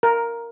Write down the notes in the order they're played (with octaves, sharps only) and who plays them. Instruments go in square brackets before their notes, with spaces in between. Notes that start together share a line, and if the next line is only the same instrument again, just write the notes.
[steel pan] A#4